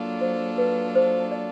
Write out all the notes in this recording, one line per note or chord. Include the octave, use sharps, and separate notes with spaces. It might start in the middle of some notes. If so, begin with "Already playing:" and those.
Already playing: F#3 A#3 D4 F4 A4
C5
B4
C5
D5